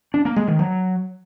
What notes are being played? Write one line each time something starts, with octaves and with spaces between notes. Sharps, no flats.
D4
A#3
G#3
D#3
F#3